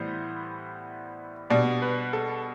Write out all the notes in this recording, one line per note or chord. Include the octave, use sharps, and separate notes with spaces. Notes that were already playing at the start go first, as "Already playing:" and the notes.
Already playing: A2 E3 G3 B3 C5
B2 G3 D4 D5
B4
A4